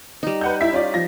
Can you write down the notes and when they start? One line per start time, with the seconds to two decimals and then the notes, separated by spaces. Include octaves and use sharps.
0.23 G3 D#4
0.41 B4 F#5 G6
0.61 E4 E5 B6
0.72 C#4 F4 D5
0.94 F3 A#6